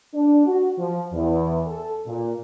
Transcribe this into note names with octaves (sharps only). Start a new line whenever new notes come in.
D4
F#4
F3
E2
A4
A#2